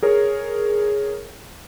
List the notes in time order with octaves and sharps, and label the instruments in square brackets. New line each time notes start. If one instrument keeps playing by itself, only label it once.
[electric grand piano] G#4 A#4 C#5